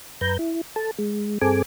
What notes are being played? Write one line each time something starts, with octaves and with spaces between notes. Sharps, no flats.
F#2 B4 A#5 G6
E4
A4 A5
G#3
G2 C4 G#4 A4 G#5 D6